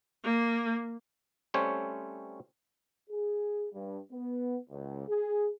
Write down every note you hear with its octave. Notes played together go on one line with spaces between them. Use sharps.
A#3
G3 A3 C4 C#4 C5 C#5
G#4
G2
B3
C#2
G#4